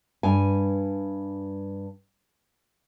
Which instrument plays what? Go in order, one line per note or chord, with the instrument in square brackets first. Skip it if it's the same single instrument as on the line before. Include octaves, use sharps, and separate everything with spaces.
[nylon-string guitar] G2 G#5